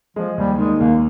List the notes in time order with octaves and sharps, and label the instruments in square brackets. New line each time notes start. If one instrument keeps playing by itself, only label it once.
[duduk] F3 [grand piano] G#3
[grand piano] D#2 [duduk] G3
[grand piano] D#3 [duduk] G#3
[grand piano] D#2 [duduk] A#3